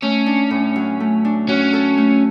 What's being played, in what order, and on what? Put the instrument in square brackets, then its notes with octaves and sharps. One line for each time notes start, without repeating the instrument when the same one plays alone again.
[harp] A3 [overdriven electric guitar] C#4
[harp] D4
A2
F#3
A3
D4
[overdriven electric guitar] C#4 [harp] F#4
[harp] A4
A3